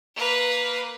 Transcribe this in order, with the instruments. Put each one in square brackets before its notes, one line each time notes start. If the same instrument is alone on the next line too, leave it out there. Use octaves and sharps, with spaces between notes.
[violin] A#3 B4